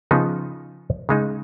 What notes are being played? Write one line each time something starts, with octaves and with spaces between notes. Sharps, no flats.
C#3 F3 B3 D#4
C#3 G#3 D#4